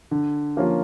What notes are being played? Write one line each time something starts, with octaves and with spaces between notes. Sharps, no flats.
D3
F3 A#3 C#4 F4